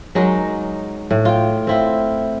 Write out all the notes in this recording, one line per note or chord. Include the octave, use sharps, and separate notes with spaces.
F#3 G#3 D#4 A#4
A2
F4 G5
C4 E4 F4